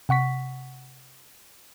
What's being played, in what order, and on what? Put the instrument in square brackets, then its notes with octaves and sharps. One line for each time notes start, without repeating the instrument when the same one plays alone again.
[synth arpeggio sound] C3 F#5 C#6 B6